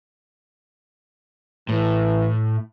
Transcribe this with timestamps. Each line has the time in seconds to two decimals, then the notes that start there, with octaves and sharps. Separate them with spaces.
1.69 A2 E3